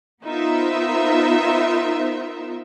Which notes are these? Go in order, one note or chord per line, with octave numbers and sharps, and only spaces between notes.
B3 D#4 F4 A#4 C5 E5